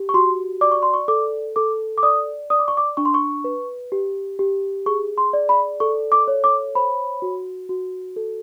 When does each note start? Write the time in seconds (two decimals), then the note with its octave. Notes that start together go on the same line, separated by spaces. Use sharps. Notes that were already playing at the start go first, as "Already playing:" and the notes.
Already playing: G4
0.09 C#6
0.14 F#4 C6
0.61 D5 D6
0.72 C#6
0.83 C6
0.94 C#6
1.08 A4 D6
1.56 A4 D6
1.98 D6
2.03 D5 D#6
2.50 D5 D#6
2.59 D6
2.68 C#6
2.77 D6
2.97 D4 C#6
3.05 C6
3.14 C#6
3.44 B4
3.92 G4
4.39 G4
4.86 G#4 C#6
5.18 C6
5.33 D5
5.49 B5
5.80 A4 C#6
6.12 D6
6.28 C#5
6.44 D6
6.75 C5 B5
7.22 F#4
7.69 F#4
8.16 A4